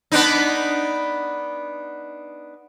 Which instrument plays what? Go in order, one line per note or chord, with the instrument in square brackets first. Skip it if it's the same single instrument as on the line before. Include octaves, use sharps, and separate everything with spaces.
[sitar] B3 D4 D#4